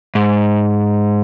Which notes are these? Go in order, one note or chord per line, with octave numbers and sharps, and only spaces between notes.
G#2